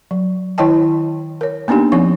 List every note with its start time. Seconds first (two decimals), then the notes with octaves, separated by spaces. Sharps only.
0.11 F#3
0.58 D#3 E4 C#5 D#5 G5 A5
1.41 A#4 C#5
1.68 A#3 B3 D4 D#4 G4
1.92 F3 C4 D#4 C#5 C#6